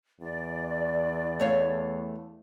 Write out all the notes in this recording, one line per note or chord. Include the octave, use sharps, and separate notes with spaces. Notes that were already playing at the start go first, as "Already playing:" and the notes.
E2 D5
A3 C#5 F5